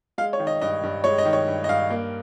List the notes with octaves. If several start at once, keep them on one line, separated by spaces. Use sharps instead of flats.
G#3 F5
C#5
D#3
D#5
G2 D#5
G2
G#3 C#5
D#5
D#3
C#5
G2
D#5
G2 F5
A#3